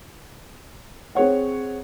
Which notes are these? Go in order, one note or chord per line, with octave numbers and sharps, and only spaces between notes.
C4 G#4 C#5 F#5